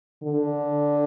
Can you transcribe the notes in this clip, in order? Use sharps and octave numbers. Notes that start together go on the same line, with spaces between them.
D3